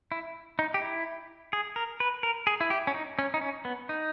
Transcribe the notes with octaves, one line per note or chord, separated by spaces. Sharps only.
E4
D#4
G4
E4
G#4
A#4
B4
A#4
G#4
E4
G4
C#4
D#4
C#4
D#4
C#4
B3
D#4